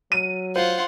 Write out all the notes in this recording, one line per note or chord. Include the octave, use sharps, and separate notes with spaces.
F#3 D#7
F4 C5 F#5